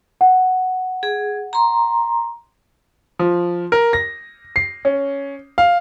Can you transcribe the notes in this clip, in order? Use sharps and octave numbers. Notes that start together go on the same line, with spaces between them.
F#5
G#4
A#5 C6
F3
A#4
A#6
C7
C#4
F5